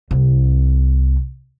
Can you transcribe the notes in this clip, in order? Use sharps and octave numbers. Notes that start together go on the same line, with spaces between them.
C2